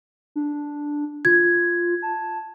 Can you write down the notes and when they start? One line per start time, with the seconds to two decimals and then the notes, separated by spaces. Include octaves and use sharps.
0.36 D4
1.25 F4 G#6
2.02 A5